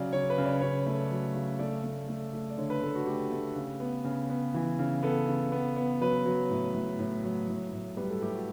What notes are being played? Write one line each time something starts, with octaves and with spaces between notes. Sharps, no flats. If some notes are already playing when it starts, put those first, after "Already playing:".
Already playing: C#3 F#3 D5
C#3 C#5
B4
C#3
D5
C#3 C#5
A3
F#3
C#3
A3 D5
A3
A3
A3
D5
D3 C#5
B4
A3 A4
F#4
A3 G4
A3
C#3
B3
C#3
B3
E3
C#3
B3 A4
C#3
B3
B3
F#3 B4
F#3
A2
A2
A2
F#3
A2
A2
G3 B4
A4
A2 G4
F#4